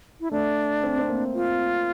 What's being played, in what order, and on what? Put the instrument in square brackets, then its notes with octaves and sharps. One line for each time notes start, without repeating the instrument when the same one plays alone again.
[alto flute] E4
[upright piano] A3 [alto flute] D4
[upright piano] C4
C4
A#3
[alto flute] F4